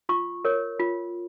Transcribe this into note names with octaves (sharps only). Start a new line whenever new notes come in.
F4 C#6
A#4 C#5
F4